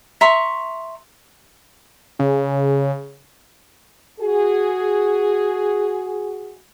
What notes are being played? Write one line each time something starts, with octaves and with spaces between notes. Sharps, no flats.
E5 A#5 C6 C#6
C#3
F#4 G#4